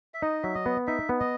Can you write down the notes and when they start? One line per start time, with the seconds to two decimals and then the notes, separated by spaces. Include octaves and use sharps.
0.14 E5
0.22 D#4 D#5
0.43 F#3 E5
0.55 D#5
0.66 B3
0.87 D#4 E5
1.09 B3
1.20 D#5